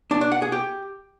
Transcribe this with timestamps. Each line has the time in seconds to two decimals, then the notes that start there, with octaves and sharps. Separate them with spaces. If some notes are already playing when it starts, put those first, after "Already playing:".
0.11 D4
0.21 D4
0.32 F#5
0.42 G#4
0.52 G4